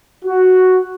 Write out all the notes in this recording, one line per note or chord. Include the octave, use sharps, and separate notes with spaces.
F#4